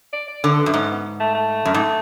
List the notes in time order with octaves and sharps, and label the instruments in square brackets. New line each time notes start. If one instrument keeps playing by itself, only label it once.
[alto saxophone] D5
D5
[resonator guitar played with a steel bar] D3 [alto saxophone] C#5
[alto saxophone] A4
B4
[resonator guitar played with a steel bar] F#2
[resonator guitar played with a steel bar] G#2 [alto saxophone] C#4
[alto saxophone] B3
A3
A3
[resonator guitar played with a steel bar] F#2
G#2